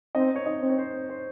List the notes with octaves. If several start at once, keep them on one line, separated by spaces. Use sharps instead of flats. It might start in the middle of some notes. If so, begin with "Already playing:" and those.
C4 D#4 D#5
C#5
D#4 D#5
C4
C#5
C5
C5